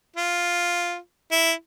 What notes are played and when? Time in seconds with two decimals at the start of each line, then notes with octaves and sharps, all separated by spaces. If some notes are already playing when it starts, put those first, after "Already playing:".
0.16 F4
1.32 E4